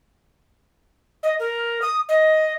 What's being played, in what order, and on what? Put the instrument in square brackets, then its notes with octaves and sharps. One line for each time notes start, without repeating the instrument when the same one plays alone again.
[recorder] D#5
A#4
D#6
D#5